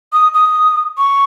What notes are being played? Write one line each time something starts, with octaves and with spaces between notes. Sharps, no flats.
D#6
D#6
C#6